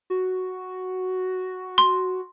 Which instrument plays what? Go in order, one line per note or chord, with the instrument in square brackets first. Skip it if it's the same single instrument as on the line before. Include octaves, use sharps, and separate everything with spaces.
[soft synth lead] F#4
[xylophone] C6